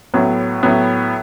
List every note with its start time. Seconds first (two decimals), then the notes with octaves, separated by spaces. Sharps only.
0.14 A2 F#3 B3
0.63 A2 F#3 B3